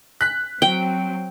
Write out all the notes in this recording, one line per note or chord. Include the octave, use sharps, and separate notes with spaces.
F#6 B6
F#3 C4 G5